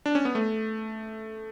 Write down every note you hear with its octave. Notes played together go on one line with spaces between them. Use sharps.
D4
C#4
B3
A3